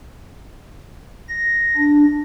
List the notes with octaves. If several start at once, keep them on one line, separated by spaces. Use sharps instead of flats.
A#6
D4